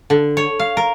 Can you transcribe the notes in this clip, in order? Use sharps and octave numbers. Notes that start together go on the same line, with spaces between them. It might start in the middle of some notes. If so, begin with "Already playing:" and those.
D3
C#5
F5
A#4